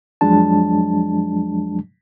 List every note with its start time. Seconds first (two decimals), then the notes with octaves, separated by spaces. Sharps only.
0.21 F2 F3 F#3 G#3 D4 A5